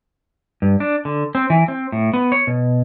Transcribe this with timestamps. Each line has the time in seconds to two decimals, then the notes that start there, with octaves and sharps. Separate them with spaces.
0.62 G2
0.80 D4
1.05 D3
1.35 C4
1.50 E3
1.68 C4
1.92 A2
2.14 B3
2.32 C#5
2.47 B2